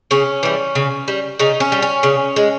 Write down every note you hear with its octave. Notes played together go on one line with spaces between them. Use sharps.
C#3 C#4
E3 G3
C#3
G3
C#3 D#4
C#4
G3
C#4
C#3
G#3